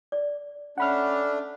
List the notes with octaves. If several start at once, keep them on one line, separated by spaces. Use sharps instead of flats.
D5
A3 C#4 D4 F#5 B5 F6